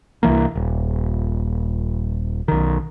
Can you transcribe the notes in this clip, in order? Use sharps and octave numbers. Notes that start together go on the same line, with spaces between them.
C2 E3 A#3
D#1
B1 D#3